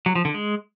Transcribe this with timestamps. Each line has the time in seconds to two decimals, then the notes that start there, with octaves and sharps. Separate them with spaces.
0.06 F#3
0.15 F3
0.25 D3
0.34 G#3